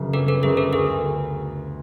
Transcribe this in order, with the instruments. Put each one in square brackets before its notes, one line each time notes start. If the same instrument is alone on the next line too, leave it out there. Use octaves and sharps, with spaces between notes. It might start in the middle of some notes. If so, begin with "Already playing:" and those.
Already playing: [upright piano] G1 F#2 C#3
[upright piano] G1 [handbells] A4 B4
[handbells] A4 B4
[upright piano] F#2 C#3 [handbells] G#4 A#4
[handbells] A4 B4
[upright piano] D2 [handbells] G#4 A#4